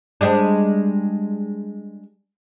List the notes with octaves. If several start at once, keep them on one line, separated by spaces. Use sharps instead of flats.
G3 G#3 D4